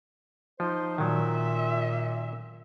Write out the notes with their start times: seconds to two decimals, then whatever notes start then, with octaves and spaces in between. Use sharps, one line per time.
0.60 F3 D#4 C5
0.98 A#2 D#3 F#3 E5